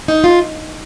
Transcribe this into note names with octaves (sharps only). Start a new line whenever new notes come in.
D#4
F4